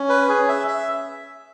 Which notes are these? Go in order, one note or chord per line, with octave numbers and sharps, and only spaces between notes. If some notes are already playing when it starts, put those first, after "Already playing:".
Already playing: C#4
B4
G#4
E5
E5